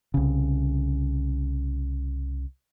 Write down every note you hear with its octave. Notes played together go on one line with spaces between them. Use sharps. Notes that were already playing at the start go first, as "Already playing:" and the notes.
C2 C#3